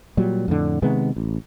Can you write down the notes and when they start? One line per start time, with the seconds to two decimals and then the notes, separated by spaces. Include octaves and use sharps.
0.17 A#2 F#3 G3
0.48 F2 A2 D3
0.82 C3 D#3 G#3 B3
1.16 A1